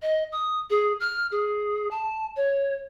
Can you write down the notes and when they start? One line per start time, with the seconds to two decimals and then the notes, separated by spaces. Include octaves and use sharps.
0.02 D#5
0.32 D#6
0.70 G#4
1.00 F6
1.32 G#4
1.91 A5
2.36 C#5